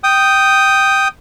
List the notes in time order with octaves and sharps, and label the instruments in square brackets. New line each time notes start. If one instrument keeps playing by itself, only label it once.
[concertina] G5 D#6